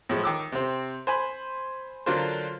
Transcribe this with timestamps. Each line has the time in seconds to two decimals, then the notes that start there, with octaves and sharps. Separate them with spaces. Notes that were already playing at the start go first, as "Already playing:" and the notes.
0.09 A2 F3 G#3
0.24 D#3 D6 E6
0.52 C3 C4
1.07 C5 G#5 B5
2.06 D3 F#3 D4 F4 A#4 C5